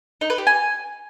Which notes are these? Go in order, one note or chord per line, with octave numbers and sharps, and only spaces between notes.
D#4
B4
G4
G#5